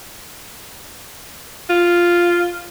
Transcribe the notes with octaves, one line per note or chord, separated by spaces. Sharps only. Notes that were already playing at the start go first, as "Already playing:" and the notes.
F4